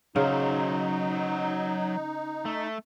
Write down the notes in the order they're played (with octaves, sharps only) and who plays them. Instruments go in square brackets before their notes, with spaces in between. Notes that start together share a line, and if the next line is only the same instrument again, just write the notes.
[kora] C#3 [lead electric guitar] F#3 C5 [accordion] D#4
[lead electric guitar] A3